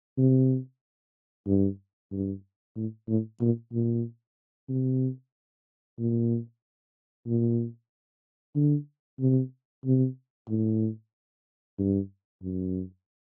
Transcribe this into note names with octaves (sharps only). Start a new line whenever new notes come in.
C3
G2
G2
A2
A2
A#2
A#2
C3
A#2
A#2
D3
C3
C3
A2
G2
F#2